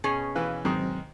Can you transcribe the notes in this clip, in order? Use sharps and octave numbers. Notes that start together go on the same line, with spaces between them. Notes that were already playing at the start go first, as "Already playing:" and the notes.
B2 C#4 G#4
E3 B4 F5
G#2 D#3 F#3 C4